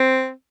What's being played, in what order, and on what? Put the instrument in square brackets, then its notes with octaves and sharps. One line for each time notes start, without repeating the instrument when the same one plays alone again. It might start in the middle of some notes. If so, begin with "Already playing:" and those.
Already playing: [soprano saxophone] C4